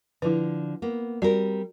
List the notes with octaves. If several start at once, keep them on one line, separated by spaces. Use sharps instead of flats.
D3 F3 E4 B4
A#3 B3
G3 C4 F#4 A#4 D5